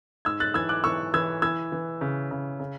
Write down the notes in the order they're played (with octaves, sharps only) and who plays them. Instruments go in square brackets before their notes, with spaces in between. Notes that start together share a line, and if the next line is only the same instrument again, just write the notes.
[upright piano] G#2 E6 G#6
F#6 A6
E3 E6 G#6
D6 F#6
E3 C#6 E6
E3 E6 G#6
E3 E6 G#6
E3
C#3
C#3
C#3